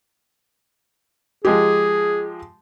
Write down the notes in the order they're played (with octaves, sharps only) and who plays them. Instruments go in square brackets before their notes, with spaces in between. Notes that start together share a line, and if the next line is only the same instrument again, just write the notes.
[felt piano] F3 G#3 G4 [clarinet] G#4